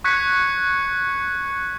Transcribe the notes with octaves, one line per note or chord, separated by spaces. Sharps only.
C#6 F#6 G#6 B6 C#7